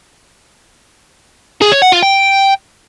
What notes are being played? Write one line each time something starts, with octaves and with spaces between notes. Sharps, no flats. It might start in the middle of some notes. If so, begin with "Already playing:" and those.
G#4
C#5
F#5
F4
G5